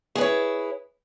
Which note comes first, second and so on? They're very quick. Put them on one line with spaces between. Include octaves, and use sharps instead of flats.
G#4 B4 C#5 E4